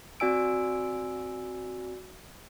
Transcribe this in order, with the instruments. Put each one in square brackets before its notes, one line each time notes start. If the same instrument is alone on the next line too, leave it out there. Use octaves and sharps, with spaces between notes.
[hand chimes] C4 F#4 D5 G#5 E6 D7